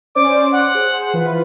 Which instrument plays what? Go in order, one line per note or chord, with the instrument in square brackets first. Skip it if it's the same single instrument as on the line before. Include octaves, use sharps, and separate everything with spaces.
[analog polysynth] C#4 C5 D5 [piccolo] D6
[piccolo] F#5
[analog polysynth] G#4 C5
E3 F4 B4